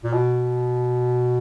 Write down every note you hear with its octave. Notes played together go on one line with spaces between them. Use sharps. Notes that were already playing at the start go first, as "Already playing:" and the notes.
A#2
B2